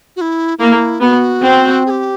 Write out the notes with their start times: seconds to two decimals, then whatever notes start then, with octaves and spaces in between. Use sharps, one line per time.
0.16 F#4
0.21 E4
0.58 A#3 E4
1.00 B3 G4
1.05 F#4
1.44 C4
1.86 G#4
1.90 G4